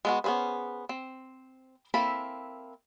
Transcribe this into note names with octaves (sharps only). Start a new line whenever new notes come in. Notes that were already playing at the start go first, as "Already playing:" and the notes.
G#3 B3 F#4
B3 C#4 G#4 B4 C5
C4
A#3 C4 E4 A4 B5